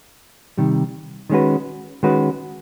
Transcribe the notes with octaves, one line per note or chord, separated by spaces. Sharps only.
C3 D#3 G3
D#3 G#3 C#4 F#4 B4
D#3 G#3 C#4 F#4 B4